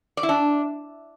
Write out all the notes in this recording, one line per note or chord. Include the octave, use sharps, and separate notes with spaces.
D5
E4
D4